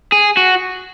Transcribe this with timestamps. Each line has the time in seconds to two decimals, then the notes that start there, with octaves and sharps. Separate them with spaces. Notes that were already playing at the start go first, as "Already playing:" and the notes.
0.12 G#4
0.37 F#4